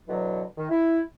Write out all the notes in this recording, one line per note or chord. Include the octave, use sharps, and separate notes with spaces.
B2 D3 E3 F#3
D#3
E4